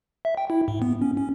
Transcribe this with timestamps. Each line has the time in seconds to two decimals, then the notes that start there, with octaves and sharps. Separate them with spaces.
0.25 E5
0.37 G5
0.50 E4
0.68 G#2
0.82 B3
1.02 C#4
1.17 C#4